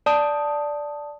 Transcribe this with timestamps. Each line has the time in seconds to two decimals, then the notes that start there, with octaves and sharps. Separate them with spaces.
0.06 D5 A5 D#6